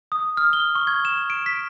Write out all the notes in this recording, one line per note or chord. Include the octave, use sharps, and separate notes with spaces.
D#6
F6
G7
C#6
G#6
E7
D7
B6